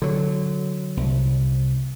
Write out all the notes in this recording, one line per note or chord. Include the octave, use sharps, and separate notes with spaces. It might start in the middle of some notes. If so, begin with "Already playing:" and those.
D3 F#3
C2